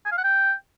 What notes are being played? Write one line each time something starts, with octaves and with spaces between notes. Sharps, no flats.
G#5
F5
F#5
G5